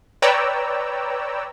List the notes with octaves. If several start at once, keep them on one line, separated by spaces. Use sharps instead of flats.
B4 C#5 D5 G5 A#5 E6